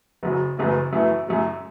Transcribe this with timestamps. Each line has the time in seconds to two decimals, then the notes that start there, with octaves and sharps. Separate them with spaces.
0.23 F#1 F#2 F#3
0.57 F#1 F#2 E3 A3 E4
0.93 F#2 E3 A3 E4
1.27 F#2 F#3 A3 E4